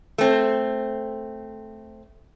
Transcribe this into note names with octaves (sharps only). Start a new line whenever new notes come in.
A3 C4